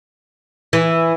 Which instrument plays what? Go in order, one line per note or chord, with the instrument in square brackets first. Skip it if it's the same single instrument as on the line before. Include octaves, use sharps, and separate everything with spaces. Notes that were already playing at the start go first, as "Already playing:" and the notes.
[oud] E3